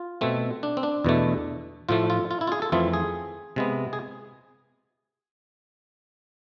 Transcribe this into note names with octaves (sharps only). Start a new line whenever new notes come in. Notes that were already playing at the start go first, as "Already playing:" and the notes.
Already playing: F4
B2 A3 C4
D4
C4
D4
E2 B2 A3
A2 F3 A3 F4
F4
F4
E4
F4
G#4
A4
F2 E3 A3 C4 F4
G#4
C3 G#3 B3
G#4